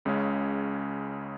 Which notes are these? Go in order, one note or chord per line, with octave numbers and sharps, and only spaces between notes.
C#2 C#3 G#3 C#4